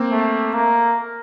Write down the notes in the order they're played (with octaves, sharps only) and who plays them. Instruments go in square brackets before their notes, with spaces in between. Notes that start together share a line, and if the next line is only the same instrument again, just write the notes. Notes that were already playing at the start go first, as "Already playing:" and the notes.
Already playing: [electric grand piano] A#3 C4
[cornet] A3
A#3